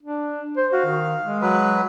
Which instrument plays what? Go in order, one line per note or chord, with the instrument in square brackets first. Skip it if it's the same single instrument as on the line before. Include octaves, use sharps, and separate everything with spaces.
[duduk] D4
C5
[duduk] F#4 [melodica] F5
[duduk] D#3
G#3
[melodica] F#3 B4